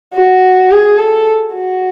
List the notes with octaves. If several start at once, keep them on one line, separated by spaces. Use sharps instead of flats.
F#4
G#4
A4
F#4